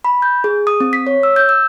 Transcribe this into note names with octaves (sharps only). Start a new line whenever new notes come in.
B5
G6
G#4
D#6
C4
B6
C#5
E6
G6
E6